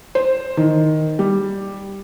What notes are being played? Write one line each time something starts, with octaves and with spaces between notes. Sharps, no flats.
C5
D#3
G3